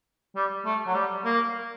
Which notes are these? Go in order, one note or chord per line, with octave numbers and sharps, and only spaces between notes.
G3
A3
F#3
G3
A#3